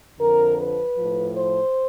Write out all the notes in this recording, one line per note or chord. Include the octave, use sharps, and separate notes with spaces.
F2 D3 F3 A#4
B4
A2 F3
C5